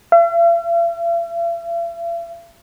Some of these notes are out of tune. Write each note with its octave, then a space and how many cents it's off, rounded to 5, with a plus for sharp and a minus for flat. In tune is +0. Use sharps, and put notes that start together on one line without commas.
E5 +45